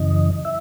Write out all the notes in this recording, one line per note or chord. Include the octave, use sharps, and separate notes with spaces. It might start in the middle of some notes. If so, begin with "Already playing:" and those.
Already playing: F#2 C#3 E3 D#5
E5